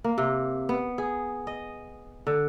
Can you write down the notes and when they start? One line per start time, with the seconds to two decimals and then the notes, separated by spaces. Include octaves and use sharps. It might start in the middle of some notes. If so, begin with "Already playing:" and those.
0.04 A#3
0.18 C3
0.69 B3
0.98 G#4
1.47 D#5
2.27 D3